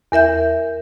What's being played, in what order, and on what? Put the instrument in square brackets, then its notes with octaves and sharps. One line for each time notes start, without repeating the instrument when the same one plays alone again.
[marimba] E2 A#4 E5 G6